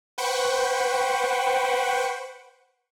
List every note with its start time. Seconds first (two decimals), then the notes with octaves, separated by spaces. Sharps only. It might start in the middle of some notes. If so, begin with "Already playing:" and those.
0.18 B4 C5 F#5 G5 B5 C#6